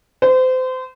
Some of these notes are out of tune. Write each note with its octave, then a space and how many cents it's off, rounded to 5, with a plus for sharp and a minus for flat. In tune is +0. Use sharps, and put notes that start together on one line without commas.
C5 -30